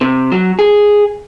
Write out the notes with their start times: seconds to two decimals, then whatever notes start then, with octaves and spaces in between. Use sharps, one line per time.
0.01 C3
0.32 F#3
0.59 G#4